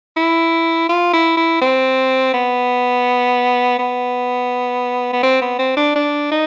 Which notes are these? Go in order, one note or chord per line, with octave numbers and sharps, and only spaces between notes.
E4
F4
E4
E4
C4
B3
B3
B3
C4
B3
C4
D4
D4
D#4